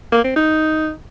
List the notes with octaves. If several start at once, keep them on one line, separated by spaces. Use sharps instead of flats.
A#3
C4
D#4